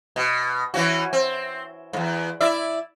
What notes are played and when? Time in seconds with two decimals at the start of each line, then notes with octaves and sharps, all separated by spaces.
0.16 B2
0.74 E3 C#4 F#4
1.13 C4
1.93 E2 G#2
2.41 E4 D5 E5